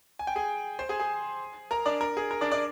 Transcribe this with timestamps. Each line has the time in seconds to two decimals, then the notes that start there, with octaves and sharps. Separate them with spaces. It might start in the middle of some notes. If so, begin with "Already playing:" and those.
0.19 G#5
0.27 G5
0.36 G#4 G#5
0.79 C5 C6
0.89 G#4 G#5
1.00 G#4 G#5
1.71 A#4 A#5
1.86 D4 D5
2.01 A#4
2.17 G#4
2.31 A#4
2.41 D4 D5
2.52 D4 D5